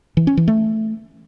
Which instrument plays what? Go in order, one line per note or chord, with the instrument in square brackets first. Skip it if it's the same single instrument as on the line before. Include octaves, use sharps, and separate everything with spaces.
[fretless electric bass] E3
C#4
E3
A3